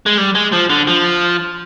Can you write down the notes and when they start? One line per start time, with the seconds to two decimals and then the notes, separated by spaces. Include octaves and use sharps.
0.06 G#3
0.18 G3
0.35 G#3
0.53 F3
0.70 D3
0.88 F3